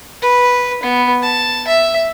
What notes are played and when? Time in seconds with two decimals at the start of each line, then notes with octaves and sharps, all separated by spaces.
0.22 B4
0.83 B3
1.22 A5
1.68 E5